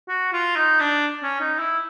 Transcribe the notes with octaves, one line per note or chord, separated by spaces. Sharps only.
F#4
F4
D#4
D4
C#4
D#4
E4